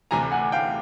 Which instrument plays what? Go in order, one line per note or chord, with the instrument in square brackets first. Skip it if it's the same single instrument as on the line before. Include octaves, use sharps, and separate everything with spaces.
[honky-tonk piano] D2 C3 E3 [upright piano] G#5 A#5
[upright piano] F#5 G#5
F5 G5